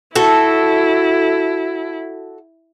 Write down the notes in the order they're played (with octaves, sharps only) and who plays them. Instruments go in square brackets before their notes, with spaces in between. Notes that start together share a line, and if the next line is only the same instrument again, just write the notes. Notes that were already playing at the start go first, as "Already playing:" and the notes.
[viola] E4 [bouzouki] F#4 A4